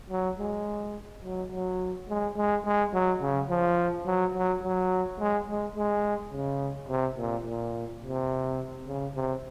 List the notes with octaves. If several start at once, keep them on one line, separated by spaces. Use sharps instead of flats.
F#3
G#3
F#3
F#3
G#3
G#3
G#3
F#3
C#3
F3
F#3
F#3
F#3
G#3
G#3
G#3
C#3
C3
A#2
A#2
C3
C#3
C3